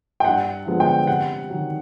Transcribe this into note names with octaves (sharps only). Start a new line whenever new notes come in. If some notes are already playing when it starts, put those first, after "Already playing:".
G5
G2 F#5
D3 F3 G#3 B3
G5
C3 F#5
D#3 F#3